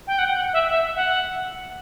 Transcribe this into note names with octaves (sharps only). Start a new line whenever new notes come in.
G5
F#5
F#5
E5
E5
F#5